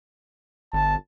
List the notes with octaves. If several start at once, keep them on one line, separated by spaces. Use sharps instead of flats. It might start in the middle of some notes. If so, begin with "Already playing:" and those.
G1 A5